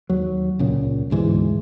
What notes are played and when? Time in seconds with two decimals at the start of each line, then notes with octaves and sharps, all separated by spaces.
0.09 D#2 F#3
0.59 C#2 A#2 C#3
1.10 E1 D2 G#2 E3